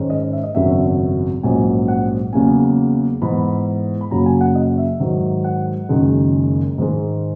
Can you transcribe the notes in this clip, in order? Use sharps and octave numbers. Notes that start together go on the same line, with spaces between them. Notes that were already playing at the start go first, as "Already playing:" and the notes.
Already playing: G#2 D#3 G#3 C#4
D#5
E5
D#5
G#1 F#2 C#3 F#3 B3 E5
A#1 G#2 F#3 C#4 G#5
F#5
E2 C#3 F#3 A#3 G#5
G#2 E3 B3 B5
B5
F#2 C#3 F#3 A#3 A#5
G#5
F#5
D#5
E5
G#2 D#3 F#3
F#5
F#1 F#2 D#3 G#3
G#2 D#3 G#3